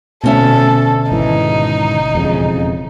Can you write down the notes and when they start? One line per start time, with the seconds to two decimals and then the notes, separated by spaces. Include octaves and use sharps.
0.24 D2 B2 C#4 A4 E5
1.12 G#1 E3 D#4
2.15 E1 F2 C#3